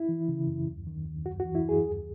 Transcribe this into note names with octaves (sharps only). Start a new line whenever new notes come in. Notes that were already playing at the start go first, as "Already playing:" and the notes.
Already playing: E4
E3
C#3
F#2
D#2
D#3
D#2
F#2 F#4
F#4
E3
E4
F#2 G#4
D#2